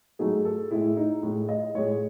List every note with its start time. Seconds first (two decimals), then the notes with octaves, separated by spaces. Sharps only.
0.19 G#2 F#3 A3 G#4
0.45 A4
0.71 A2 G#3 E4
0.97 D#4
1.23 A2 G#3
1.49 D#5
1.75 A2 G#3 C#5